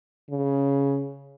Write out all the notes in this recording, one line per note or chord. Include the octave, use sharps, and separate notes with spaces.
C#3